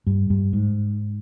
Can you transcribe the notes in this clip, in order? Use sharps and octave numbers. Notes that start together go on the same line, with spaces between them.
G2
G2
G#2